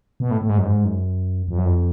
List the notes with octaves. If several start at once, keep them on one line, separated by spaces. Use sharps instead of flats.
B2
A2
A2
G#2
F#2
G#2
F#2
F2
F#2
F2